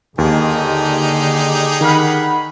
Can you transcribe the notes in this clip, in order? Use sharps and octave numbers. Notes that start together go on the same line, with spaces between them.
D#2 D3 D#4 G4 G#4
D#3 F#5 B5 F6